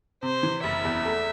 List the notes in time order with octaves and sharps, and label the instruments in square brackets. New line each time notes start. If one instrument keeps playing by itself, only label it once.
[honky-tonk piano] C3 [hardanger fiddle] C5
[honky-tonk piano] E3
[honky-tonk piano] F#1 [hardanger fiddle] E5
[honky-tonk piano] E2
A3